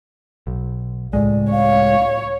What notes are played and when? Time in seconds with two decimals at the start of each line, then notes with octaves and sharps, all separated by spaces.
0.47 B1
1.13 C#2 A2 G#3 D5
1.52 C#5 F5